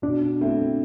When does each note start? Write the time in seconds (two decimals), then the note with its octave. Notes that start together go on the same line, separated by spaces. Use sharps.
0.02 B2 D4
0.40 A3 C4 E4